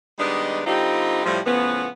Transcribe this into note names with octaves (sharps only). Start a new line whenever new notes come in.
D#3 G3 G#3 B3 D4 D#5
D3 G3 C4 D#4 F4 G4
A2 F3 G3
A2 C#3 F3 B3